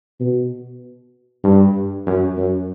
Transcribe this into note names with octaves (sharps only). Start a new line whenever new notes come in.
B2
G2
F#2
F#2